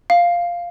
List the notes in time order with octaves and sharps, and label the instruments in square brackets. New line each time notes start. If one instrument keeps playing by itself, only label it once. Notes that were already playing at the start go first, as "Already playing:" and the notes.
[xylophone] F5